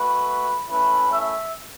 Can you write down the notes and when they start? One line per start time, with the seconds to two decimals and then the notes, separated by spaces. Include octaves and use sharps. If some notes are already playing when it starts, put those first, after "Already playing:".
Already playing: A3 F#4 B4
0.69 A3 C#4 E4 B4
1.10 E5